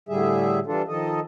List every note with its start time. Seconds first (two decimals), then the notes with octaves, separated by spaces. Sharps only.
0.09 A2 D3 G3 G#4 E5
0.67 E3 G3 D4 F4 A4
0.88 D#3 F3 A4 D#5